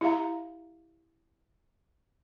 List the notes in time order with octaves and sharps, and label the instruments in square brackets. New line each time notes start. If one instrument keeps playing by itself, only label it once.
[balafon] E4 G4 E5 F5 A#5